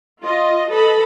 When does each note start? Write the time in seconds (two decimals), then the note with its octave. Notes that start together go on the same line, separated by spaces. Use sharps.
0.22 F4 D#5
0.70 A4 B4 D#5 B5